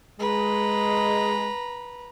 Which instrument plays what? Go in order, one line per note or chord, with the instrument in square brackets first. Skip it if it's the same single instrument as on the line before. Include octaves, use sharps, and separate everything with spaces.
[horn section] G#3 [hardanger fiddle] B4 A#5